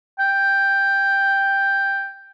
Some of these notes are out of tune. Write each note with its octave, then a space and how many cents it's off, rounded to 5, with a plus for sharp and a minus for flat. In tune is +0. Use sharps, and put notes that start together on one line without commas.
G5 +5